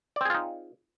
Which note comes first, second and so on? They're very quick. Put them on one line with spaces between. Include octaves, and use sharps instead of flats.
D5 C4 G#4 F4 D#4